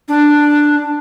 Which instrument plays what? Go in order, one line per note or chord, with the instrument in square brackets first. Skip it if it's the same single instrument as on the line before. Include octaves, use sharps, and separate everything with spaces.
[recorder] D4